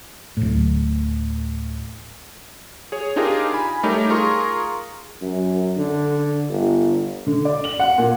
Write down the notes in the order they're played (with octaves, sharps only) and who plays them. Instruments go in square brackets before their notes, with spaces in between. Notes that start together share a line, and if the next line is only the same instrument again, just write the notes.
[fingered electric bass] D1 A2
[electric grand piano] G#4 C#5
D4 D#4 F4 G4 G#4 A#4
G#5 B5
G3 A3 D#4 G4 A#4 C#5
F4 G#4 A#4 A#5 C6 C#6
[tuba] F#2
D3
G1
[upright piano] D3
D5
F#7
F#5
A#2